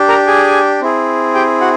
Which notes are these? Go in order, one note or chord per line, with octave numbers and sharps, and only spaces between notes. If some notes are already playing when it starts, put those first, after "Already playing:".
Already playing: D4 G4
A#4 A#5
G#4 G#5
C4 E4 G#4
G4 G5
F#4 F#5